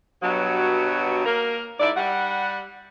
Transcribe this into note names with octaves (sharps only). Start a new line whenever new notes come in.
G2 B2 F#3
A#3 A#4
G#2 E4 D5
G3 F#5